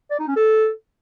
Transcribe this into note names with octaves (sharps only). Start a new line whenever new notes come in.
D5
D#4
C#4
A4